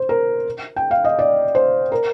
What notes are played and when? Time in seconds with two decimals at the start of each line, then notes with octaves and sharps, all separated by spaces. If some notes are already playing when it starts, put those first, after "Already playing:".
Already playing: C5
0.09 A#4
0.76 G5
0.91 F5
1.05 D#5
1.19 D5
1.55 C5
1.92 A#4